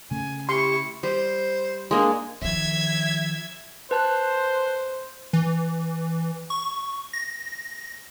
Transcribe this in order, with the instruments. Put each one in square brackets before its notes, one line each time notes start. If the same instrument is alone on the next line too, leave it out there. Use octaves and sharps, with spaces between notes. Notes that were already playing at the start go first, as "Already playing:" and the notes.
[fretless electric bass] C#3 A3 [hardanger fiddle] G#5
[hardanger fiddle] E4 C#6 [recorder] G4 [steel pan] C6
[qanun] G3 [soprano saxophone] C5
[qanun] G#3 A#3 D4
[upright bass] D#3 F3 [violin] E5 G#6
[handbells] B4 A5 F#6 [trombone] C5
[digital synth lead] E3
C#6
A#6